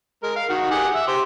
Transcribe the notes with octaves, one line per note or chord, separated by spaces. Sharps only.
G#3 A#4
F5
D#3 F#4
G4 G#4 F#5
E5
G4 C5